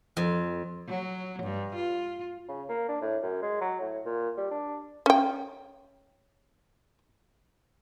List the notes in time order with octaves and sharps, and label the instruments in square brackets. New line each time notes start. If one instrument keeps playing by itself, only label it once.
[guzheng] F2
[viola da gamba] F#3
G2
F4
[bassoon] C#3
A#3
D4
A2
F#2
G#3
F#3
A2
A#2
G3
D4
[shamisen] C#4 G5